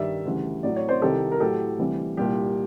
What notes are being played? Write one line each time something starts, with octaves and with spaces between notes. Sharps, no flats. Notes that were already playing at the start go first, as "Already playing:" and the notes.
Already playing: G2 D#3 G3 D5 E5
D2 C#3 E3 G3
A2 F#3 D5
C#5
C5 D5
C2 C3 D#3 G4 A4
A#4
A2 F#3 G4 A4
D2 C3 E3 G3
C2 A#2 G3 G4